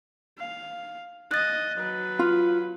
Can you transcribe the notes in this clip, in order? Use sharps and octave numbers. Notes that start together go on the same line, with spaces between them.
F5
D#5 F#6 A6
F#3 B4
F4